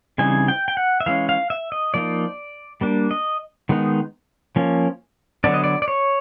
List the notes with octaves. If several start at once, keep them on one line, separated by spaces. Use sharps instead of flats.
C#3 E3 G3 C4 D#4 G#5
G5
G5
F#5
E5
E3 G#3 C#4 F5
F5
E5
D#5
F3 A#3 D#4 D5
G3 A#3 D4
D#5
D#3 G#3 B3 D#4
F3 A#3 C#4
D3 F#3 B3 D4 D5
D#5
D5
D5
C#5